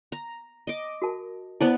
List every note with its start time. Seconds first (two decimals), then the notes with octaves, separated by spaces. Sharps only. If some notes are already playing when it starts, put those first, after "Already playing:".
0.12 A#5
0.67 D#5 D6
1.02 F#4 A#4 A5
1.61 B3 E4 B4 C5 D5 A5